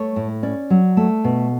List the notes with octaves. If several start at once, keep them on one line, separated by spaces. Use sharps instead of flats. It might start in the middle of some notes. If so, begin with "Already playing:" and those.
Already playing: A3 C#5
A2
C#4 D5
F#3
A3
B2